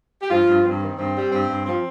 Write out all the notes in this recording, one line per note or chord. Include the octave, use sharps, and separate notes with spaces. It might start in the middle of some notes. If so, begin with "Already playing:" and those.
G4
G2 F3 F4
G2
G2 C4
D#3
G2 C4
G3
G2 C4
G2
F3 C4